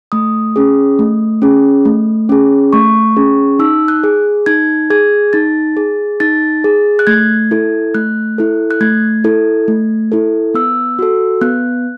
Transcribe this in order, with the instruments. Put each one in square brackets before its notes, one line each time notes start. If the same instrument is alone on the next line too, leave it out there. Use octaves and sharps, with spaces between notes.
[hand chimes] A3 D#6
C#4 G#4
A3
C#4 G#4
A3
C#4 G#4
A3 C#6
C#4 G#4
D#4 E6
F#6
G#4
D#4 G#6
G#4 G#6
D#4 A6
G#4
D#4 A6
G#4
F#6
A3 G#6
E4 A4
A3 F#6
E4 A4
F#6
A3 G#6
E4 A4
A3
E4 A4
B3 E6
F#4 A4
B3 F#6